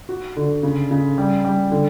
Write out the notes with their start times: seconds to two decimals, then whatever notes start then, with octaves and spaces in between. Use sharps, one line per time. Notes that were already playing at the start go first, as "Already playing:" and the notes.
0.09 F#4
0.36 D3
0.63 C#3
0.91 C#3
1.18 G3
1.44 G3
1.71 D3